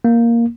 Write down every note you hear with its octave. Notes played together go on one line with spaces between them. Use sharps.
A#3